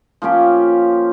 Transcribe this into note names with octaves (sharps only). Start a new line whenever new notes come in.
F3 A#3 C#4 G4